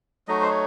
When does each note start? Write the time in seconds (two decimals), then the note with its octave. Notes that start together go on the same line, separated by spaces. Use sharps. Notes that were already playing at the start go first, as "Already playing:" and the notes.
0.28 F#3 A3 D#4 F#4 D#5
0.42 C5
0.51 C#5